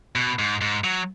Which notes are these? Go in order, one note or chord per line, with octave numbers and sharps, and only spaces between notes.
B2
G#2
G#2
F#3